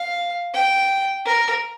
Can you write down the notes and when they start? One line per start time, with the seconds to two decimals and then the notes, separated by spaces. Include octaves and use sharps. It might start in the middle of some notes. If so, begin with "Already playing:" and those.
Already playing: F5
0.54 G5
1.25 A#4